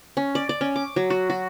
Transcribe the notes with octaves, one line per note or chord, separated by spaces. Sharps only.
C#4
D5
D5
C#4
D6
F#3
F#4
F#4